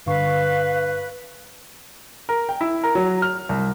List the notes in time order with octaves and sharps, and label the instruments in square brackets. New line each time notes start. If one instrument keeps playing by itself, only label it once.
[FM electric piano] G2 D3 C#6 [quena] B4 [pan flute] F5
[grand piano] A#4
G5
E4
A#4
F#3
F6
C2